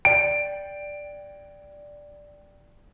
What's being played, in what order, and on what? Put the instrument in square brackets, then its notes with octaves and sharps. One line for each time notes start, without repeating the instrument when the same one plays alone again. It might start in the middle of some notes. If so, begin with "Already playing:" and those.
[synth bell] D5 G5 [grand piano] D7